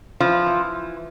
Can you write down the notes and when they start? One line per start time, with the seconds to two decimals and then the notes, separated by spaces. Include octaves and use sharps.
0.20 E3 F3 F4
0.46 E3